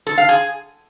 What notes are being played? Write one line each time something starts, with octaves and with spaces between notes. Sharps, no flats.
A4
F5
G#4